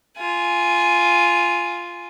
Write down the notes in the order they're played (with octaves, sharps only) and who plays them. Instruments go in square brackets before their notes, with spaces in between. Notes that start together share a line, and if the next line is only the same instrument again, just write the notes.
[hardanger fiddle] F4 G#5